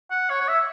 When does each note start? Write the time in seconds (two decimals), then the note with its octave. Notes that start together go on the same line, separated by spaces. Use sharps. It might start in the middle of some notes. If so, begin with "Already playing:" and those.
0.11 F#5
0.30 C#5
0.41 C#5
0.48 E5